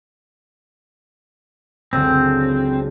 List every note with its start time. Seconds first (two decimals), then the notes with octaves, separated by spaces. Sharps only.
1.93 F#1 C#2 D3 C4